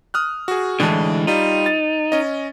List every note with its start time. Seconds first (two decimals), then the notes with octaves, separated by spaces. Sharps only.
0.14 D#6 F6 F#6
0.48 F#4 G#4
0.80 A2 D3 E3 G#3 A5
1.27 G3 D#4 F4
1.66 A6
2.12 C#4 D#5